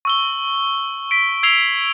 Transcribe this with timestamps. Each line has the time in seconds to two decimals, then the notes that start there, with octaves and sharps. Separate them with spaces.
0.05 C#6 E6 G7
1.11 B6 D7
1.43 E6 G#6 C7 F7 G7